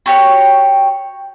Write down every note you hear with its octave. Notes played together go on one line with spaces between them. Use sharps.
F#4 G4 C#5